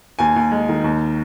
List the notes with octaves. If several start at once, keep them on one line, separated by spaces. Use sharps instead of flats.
D#2 G#5
D#2
G#3
D#3
D#2